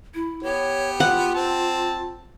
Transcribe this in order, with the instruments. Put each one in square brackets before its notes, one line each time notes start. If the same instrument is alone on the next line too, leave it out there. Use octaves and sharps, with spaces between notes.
[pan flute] E4
[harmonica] B3 G4 [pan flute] C#5
[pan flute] F4 [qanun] F#5
[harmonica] C4 A5